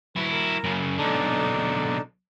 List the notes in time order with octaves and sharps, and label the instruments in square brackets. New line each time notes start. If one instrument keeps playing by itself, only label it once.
[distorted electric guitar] F#3 E4 [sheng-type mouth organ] B4
[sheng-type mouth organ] A#4
[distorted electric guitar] F#2 C#3
[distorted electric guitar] B1 D3 [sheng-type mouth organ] D4 D#4 A4